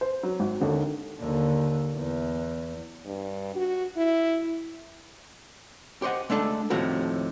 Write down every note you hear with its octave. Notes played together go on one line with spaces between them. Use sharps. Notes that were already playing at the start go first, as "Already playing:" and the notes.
C5
F#3
G#1
D#2 D3 D#3
D#2 D3
E2
G2
F#4
E4
G4 C5 C#5 D#5 F#5
G#3 A3 D4 A4
D#2 A2 C3 F3 F#4 A4